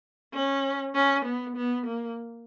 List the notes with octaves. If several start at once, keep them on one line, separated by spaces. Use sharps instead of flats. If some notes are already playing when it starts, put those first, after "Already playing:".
C#4
C#4
B3
B3
A#3